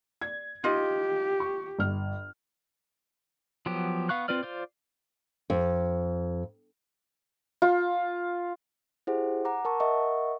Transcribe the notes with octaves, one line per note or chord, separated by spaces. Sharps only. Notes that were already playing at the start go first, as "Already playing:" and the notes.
D5 G#6
D#4 F4 G4 D#5
C#6
G1 F6
F3 F#3 B3 G4
B3 F5 C#6 F#6
C4 F4 B4 D5 F6
F4 C5 D5
F2
F4
E4 G4 G#4 C5 F#5
F#5 A#5 D6
A#4 A5 C#6
A#4 D#5 E5 F#5 C#6